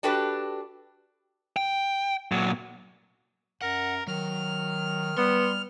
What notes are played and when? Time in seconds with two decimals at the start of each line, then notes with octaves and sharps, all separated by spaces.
0.03 D4 F#4 G4 A4 B4
1.57 G5
2.32 A#2 F#3
3.62 F#2 A#4 F#5
4.07 D#3 F#3 F6
5.17 G3 B3 C6